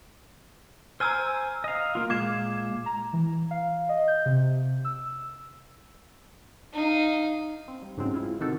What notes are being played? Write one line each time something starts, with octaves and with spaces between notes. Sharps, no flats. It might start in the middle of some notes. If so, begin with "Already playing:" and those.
C5 G#5 A#5 E6 F6
D#5 F5
A#3 F4
A#2 G#3 F5 D6 G#6 E7
A#5
E3
F5
D#5
G6
C3
E6
D#4 F5
C4
G3
G#2 C#3 F#3 G#3 C4
G#3 E4 F4
C3 D#3 C4 F#4 G4 A4